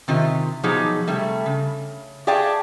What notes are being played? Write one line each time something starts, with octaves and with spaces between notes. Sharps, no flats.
C3 D#3 F4 G4
B2 F3 F#3 D#4 G4 G#4
C3 G3 A3
C#3
G4 G#4 D5 F5 G5 A5